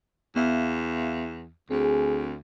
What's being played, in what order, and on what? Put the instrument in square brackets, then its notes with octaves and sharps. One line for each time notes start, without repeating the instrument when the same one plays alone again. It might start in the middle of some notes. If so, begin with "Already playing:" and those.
[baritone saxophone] E2 [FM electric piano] B3 E5 F5
[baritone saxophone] D2 [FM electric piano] C4 [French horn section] G#4